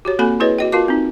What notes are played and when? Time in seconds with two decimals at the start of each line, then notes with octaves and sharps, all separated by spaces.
0.05 F#4 G4 C#5
0.19 A#3 C4 F#4 A4 G#5 B5
0.40 E4 G#4 B4 C#5 D#5
0.59 F#4 D#5 G5
0.72 F4 F#4 A#4 F5 A5 D6
0.88 C4 D#4